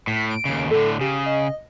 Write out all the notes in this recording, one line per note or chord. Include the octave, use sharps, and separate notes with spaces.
A2 B6
D7
D#2 C#3
A2 D3 A4
C#3 G4
D#5